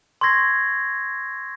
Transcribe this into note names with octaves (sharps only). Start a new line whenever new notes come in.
C6 C#6 E6 G#6 A#6 C7